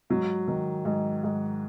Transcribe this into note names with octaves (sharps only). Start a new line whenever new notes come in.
G#2 F#3
D#3
G#2
G#2